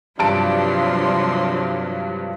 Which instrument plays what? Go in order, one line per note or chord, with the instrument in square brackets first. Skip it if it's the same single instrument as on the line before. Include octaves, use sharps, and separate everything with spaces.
[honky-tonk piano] G2 A5 D7 [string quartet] C3 F3 F#3 [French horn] D4 [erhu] C6